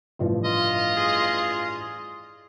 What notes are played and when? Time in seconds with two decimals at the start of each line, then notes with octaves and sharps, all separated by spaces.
0.19 A1 G2 F3
0.45 F4 D#5
0.97 G#4